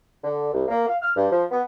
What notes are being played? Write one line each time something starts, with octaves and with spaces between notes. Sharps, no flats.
D3
C2
A#3
F5
F6
G2
F3
B3